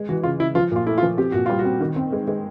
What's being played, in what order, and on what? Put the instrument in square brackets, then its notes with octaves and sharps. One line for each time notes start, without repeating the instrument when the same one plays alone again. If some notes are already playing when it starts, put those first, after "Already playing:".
Already playing: [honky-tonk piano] G#3
[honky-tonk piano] E3 [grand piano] F#4
[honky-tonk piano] C#3 [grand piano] F4
[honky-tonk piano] C#3 [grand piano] E4
[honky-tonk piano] F3 [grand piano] F4
[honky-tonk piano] A#2 [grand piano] F4
[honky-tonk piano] A3 [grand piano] E4
[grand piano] F4
[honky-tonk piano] F3
[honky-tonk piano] C4 [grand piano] G4
[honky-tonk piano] A#2 [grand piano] F#4
[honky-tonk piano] G3 [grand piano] F4
[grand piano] F#4
[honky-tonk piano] C4
D#3
C4
G#3
G#3